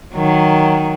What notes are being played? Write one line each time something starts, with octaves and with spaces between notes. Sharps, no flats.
D#3 F#3